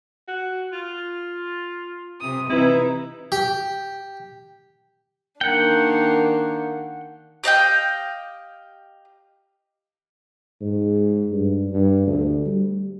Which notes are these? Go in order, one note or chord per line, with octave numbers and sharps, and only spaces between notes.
F#4
F4
C3 D#6
C3 E3 D#4 E4 B4
G4
D#3 A#3 D4 F#5 G5
G4 D#5 F5 G5
G#2
G2
G2
D2
G3